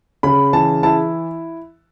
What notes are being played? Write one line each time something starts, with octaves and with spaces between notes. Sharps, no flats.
C#3 B5
E3 A5
E4 A5